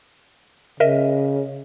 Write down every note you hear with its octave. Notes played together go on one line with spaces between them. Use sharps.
C#3 A#4 D#5 E5